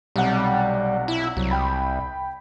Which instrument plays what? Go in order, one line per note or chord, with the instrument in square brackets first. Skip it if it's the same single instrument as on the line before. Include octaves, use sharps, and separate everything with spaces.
[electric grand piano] B1 C3 F#5 [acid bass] G3
[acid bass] E4
[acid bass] C2 [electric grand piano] F#3
[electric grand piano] G5 B5